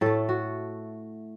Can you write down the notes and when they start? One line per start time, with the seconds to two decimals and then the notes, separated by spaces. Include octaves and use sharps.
0.01 A2 A3 A4
0.29 F#4